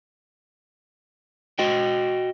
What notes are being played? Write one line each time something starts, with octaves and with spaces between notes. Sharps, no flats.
F#4 D#5 G5